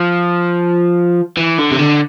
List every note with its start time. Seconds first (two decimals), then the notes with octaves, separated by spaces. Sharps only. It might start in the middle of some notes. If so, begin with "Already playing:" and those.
Already playing: F3
1.37 E3
1.58 D3
1.71 C3
1.79 D3